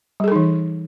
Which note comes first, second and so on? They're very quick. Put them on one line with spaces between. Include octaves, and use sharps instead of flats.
G3 G#4 A4 D#4 E3